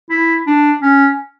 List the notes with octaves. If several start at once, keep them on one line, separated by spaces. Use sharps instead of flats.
E4
D4
C#4